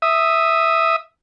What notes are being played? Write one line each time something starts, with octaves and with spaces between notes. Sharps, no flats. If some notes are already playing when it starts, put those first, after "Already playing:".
E5 D#6